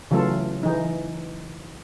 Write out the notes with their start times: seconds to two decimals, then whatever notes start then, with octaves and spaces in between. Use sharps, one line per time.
0.11 C#3 E3 F#3 A3 F4 A4
0.63 E3 D#4